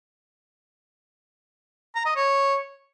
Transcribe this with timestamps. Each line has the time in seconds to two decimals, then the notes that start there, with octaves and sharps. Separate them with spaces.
1.96 A#5
2.06 D#5
2.16 C#5